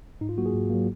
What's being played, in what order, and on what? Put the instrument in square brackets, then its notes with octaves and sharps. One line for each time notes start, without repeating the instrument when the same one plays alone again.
[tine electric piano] G#2 D#4
F4
F#3 A#3 F#4
G#4
G#2
F#3 A#3